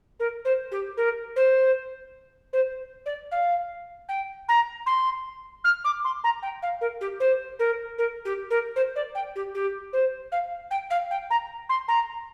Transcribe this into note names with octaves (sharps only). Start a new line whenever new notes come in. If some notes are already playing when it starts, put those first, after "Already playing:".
A#4
C5
G4
A#4
C5
C5
D5
F5
G5
A#5
C6
F6
D6
C6
A#5
G5
F5
A#4
G4
C5
A#4
A#4
G4
A#4
C5
D5
G5
G4
G4
C5
F5
G5
F5
G5
A#5
C6
A#5